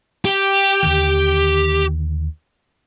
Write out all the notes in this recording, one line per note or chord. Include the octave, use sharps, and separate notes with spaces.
G4
D#2 D3 D#3